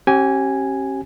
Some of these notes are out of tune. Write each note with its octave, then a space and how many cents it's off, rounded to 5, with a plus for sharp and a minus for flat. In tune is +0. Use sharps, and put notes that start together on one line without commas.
C#4 -40 G4 -30 G#5 +0